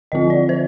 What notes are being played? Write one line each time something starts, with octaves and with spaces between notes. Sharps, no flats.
D3 F3 C4 F4 D#5
D5
C5